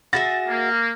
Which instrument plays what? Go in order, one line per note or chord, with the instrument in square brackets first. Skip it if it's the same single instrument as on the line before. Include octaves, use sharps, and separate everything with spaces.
[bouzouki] F#4 G#4 E5 [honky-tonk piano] A6 A#6
[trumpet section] A#3